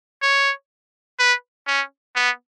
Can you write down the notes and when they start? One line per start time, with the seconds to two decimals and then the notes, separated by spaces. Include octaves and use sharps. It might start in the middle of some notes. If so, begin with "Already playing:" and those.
0.22 C#5
1.19 B4
1.67 C#4
2.16 B3